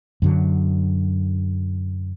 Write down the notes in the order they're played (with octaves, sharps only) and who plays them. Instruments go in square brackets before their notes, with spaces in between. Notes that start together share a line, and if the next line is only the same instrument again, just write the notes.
[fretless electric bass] F#2 D3 F#3